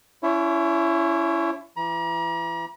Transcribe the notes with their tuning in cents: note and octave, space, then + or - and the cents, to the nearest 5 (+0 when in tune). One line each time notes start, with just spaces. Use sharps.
C#4 +40 E4 +25 C#5 -25
E3 +30 A#5 +40